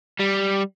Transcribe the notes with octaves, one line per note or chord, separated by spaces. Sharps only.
G3